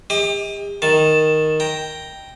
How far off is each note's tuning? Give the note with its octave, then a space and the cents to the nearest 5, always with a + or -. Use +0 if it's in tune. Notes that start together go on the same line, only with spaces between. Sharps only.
G4 +40 D#5 +30 D6 +45
D#3 +0 A5 +0
G5 +0 A#5 +0